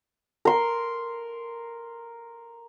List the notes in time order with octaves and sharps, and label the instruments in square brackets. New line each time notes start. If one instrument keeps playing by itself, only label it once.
[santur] A#4 C6